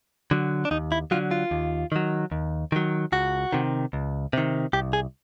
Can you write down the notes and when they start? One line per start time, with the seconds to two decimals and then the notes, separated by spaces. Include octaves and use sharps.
0.31 D3 F#3
0.65 D4
0.71 D#2 D#4
0.92 E4
1.11 D3 F#3 F4
1.31 F4
1.51 D#2
1.92 D#3 F#3
2.32 D#2
2.72 D#3 F#3
3.12 C#2 F#4
3.53 C3 D#3
3.93 C#2
4.33 C3 D#3
4.73 C2 G4
4.93 G#4